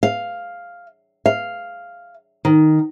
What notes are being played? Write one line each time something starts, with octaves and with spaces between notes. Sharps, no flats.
F5
F5
D#3